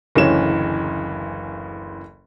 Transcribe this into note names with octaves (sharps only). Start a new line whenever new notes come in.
F#1 D2 C#3 E3 C#5 E7